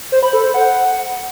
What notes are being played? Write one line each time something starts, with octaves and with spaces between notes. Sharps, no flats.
C5
B5
A4
C5
F#5